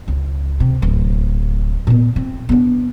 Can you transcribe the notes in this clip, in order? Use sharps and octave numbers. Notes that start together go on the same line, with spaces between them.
C#2
C3
D1
A#2 B3
C4
B3 D4